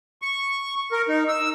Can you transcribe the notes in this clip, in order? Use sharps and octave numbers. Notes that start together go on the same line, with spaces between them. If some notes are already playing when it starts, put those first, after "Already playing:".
C#6
A#4
D#4
E6